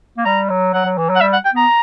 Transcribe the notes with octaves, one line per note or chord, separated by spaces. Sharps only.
A#3
G3 A#5
F#3
F#3 F#5
F#3
E3
F#3
F#5
G3 E5
F#5
G5
B3 A#5